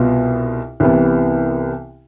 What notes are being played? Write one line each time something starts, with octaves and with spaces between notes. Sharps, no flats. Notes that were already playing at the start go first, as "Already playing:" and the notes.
Already playing: C2 B2 B3 F4
C2 C3 E3 B3